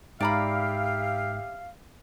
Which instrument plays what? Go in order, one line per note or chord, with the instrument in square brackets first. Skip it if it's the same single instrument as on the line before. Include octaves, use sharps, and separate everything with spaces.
[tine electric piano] G#2 [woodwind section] G4 E5 F5 [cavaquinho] D5 A#5 B5